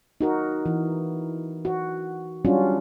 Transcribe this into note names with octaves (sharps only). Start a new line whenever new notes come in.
D#4 F#4 A#4
E3
F#4
F#3 G3 C#4 D4 F4 F#4